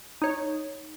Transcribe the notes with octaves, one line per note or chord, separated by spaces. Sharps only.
D#4 C#5